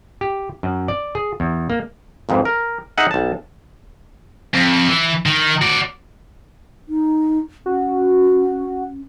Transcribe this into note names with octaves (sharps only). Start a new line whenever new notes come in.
G4
F#2
D5
G#4
E2
A#3
G#1 F2 G#2 E3
A#4
D#4 G#4 E5 F#5 G#5
B1 A5
F2
E3
D#3
F#4 D5
D#4
C#4 F#4